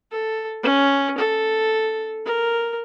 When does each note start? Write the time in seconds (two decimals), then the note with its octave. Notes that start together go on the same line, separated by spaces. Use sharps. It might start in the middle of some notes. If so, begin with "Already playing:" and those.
0.12 A4
0.63 C#4
1.17 A4
2.25 A#4